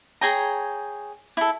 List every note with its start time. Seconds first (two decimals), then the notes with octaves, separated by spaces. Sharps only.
0.21 G#4 C#5 G5 A#5
1.37 E4 A4